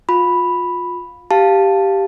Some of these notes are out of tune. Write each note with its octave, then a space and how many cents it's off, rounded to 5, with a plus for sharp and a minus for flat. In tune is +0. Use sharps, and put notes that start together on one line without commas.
F4 +25 B5 +0
G4 +0 F5 +0 A5 +0